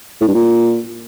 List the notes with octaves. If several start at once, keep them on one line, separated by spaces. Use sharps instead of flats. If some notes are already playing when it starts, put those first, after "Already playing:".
A2
G2
A#2